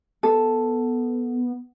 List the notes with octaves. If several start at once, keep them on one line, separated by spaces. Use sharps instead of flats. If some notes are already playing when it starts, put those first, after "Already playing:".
B3 A4